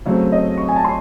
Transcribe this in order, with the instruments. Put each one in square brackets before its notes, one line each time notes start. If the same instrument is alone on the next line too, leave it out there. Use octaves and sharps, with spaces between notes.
[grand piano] C#3 F#3 A3 C4 [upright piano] C#5
[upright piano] D#5
C#6
G#5
A5
C6